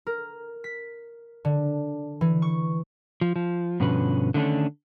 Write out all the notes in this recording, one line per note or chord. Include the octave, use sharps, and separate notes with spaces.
A#4
B6
D3
E3
C#6
F3
F3
G2 B2 D3 F3 C#4 B4
D3 D#3 A3 C#4 D4